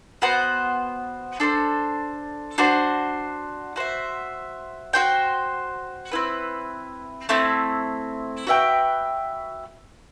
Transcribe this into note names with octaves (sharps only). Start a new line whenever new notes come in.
B3 F#4 C5 F#5
D4 A4 C5
D4 F#4 C5
F#4 C5 E5
F#4 C5 G5
C4 E4 B4
A3 C4 E4
F#4 B4 E5 G5